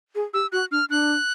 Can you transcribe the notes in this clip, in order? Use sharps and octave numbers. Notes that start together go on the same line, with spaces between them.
G#4
G4 E6
F#4 F#6
D4 F6
D4 F#6